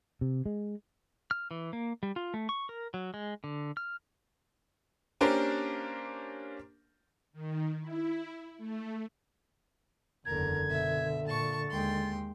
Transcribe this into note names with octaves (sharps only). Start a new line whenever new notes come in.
C3
G#3
F6
E3
A#3
G3
F4
A3
C#6
A#4
F#3
G#3
D3
F6
A#3 C#4 D4 G4 A#4 C5
D#3
E4
A3
F#1 E2 D3 A#4 G#6
B2 E5
A#2 A5 C#6 A6
D#2 G#3 G5 C6